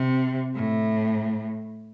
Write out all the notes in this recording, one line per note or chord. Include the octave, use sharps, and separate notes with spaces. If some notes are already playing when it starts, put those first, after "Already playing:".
Already playing: C3
A2